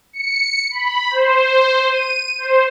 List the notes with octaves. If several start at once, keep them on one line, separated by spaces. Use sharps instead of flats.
C#7
B5
C5
D#7
C5